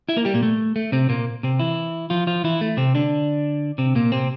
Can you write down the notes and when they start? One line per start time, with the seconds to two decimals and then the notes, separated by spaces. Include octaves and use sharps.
0.09 E4 E5
0.17 A#3 A#4
0.25 G3 G4
0.34 A#2 A#3
0.43 A3
0.76 A3
0.92 C3 C4
1.09 A#2 A#3
1.43 C3 C4
1.59 E3 E4
2.10 F3 F4
2.27 F3 F4
2.44 E3 E4
2.61 A3
2.77 C3 C4
2.95 D3 D4
3.78 C3 C4
3.95 A#2 A#3
4.12 C3 C4